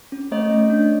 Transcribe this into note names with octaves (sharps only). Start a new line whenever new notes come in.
C#4
A3 C#5 D#5
A3
D4